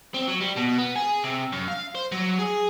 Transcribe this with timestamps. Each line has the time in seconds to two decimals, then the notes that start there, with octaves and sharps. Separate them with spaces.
0.14 C4
0.27 F#3
0.41 G3
0.56 B2
0.78 B3
0.96 G#4
1.24 C3
1.53 F#2
1.68 F5
1.95 C5
2.12 F#3
2.39 G#4